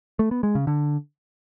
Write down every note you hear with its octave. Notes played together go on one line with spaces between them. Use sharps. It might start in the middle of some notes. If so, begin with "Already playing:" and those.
A3
B3
G#3
C#3
D3